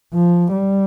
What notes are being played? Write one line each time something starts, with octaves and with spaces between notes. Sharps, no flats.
F3
G3